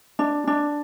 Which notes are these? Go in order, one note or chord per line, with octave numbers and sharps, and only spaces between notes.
D4
D4